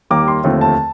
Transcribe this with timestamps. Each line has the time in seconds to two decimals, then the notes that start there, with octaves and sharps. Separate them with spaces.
0.10 D#2 D#3 G3 A#3 D6
0.28 C6
0.44 D#2 D3 F3 A3 C4
0.61 A5